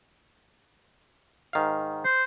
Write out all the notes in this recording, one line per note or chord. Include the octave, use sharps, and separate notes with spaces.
G#2 D#3 F5
C5